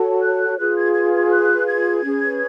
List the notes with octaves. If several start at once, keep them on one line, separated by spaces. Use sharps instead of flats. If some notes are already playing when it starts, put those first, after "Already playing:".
Already playing: F#4 A4 C#5
F#6
F4 G#4 B4 F#6
G#6
G#6
G#6
F#6
G#6
C#4 G#4 B4